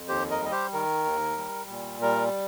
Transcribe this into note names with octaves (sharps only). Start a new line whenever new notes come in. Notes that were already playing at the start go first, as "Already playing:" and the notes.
Already playing: F2
D#2 G4 C5
A#4 D#5
G3 D#5
G4 C5
D#3 A#4
D#2
G3
A#2
G3 A#4